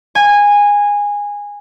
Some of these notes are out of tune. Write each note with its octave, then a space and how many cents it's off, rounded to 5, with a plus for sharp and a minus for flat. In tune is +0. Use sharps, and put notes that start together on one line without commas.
G#5 -15